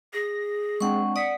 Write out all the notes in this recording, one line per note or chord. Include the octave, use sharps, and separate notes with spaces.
G#4 A#6
G#3 C4 D4 F#5 C#6
D5 F#5 D#6 B6 C#7